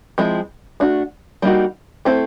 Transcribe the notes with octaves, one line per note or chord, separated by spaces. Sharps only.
F3 G#3 C4 E4
A3 D4 F#4
G3 A#3 D#4 F#4
A3 C4 E4 A4 C5